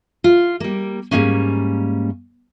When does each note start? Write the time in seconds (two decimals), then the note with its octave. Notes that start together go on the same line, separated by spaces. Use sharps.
0.24 F4
0.60 G3 A#3
1.11 G#2 G3 G#3 A#3 C#4